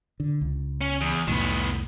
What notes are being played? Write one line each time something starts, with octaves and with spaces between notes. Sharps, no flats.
D3
C#2
C#4
E2
C2 F2 A2 D#3 B3